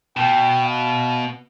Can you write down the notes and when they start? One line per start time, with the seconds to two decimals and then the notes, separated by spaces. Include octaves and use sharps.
0.17 B2 G5
0.65 F5